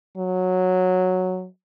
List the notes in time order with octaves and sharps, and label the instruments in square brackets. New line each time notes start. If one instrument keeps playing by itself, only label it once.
[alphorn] F#3